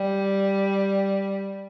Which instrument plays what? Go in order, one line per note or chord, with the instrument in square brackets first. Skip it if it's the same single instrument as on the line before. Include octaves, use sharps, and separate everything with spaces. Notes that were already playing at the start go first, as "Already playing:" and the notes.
Already playing: [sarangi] G3